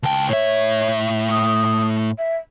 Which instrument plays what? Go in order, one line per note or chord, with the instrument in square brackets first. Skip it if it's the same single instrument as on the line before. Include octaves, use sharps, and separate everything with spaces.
[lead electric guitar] C#2 G5 [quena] A5
[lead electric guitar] A2 E5 [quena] C#5
[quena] D#6
E5